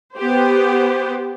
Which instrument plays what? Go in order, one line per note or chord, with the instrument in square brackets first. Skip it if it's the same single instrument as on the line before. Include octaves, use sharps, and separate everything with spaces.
[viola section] B3 G4 C5